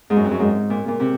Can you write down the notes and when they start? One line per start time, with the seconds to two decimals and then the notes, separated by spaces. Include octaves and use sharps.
0.10 G#2
0.16 F#2
0.25 F2
0.31 F#2
0.39 G#2
0.70 A#2
0.88 A#2
1.00 C3